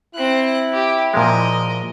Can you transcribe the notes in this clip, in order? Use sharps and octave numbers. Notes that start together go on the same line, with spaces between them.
C4 E4 F#6
G4
A#2 F3 G#3 A#4 D#5